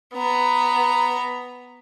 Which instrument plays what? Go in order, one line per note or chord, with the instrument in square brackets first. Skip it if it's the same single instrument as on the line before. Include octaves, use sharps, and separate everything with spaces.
[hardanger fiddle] B3 A#5